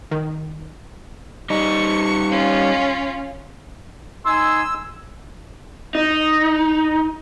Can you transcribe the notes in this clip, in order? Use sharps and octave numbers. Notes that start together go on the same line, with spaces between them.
D#3
G3 D#4 C#6
C#4 F4
D#4 G#5 C6 E6
D#4